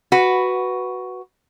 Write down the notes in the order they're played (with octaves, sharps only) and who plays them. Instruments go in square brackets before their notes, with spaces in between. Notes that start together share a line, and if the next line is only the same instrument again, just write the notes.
[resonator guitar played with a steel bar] F#4 B4